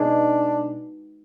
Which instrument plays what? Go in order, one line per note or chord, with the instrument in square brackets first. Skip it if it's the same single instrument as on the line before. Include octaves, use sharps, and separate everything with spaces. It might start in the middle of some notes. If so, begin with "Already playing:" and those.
Already playing: [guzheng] B2 G#3 D#4 G#4 [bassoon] D4